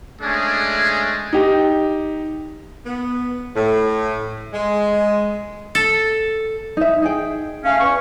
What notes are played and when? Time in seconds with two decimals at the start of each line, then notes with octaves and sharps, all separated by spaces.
0.21 G#3 A3 C#4 D4 G#4
1.33 D#4 G4
2.86 B3
3.56 A2
4.53 G#3
5.75 A4
6.77 D#4 E5
7.02 D#4 G#4 G5
7.64 A3 C#4 F5
7.80 E2 C#4 C#6